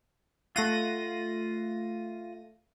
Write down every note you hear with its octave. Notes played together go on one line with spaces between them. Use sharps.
A3 F4 F5 F#5 A#6 D#7